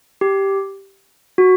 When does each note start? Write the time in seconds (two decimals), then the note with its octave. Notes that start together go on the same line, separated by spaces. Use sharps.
0.21 G4
1.38 F#4